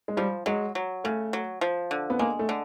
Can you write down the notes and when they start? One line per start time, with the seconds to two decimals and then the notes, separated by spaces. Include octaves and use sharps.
0.08 G#3
0.17 F3 G3
0.46 F#3 G#3
0.75 F#3
1.04 C#3 A3
1.33 F#3
1.61 F3
1.91 D3
2.10 B3
2.19 G#3 A#3
2.39 A3
2.49 D3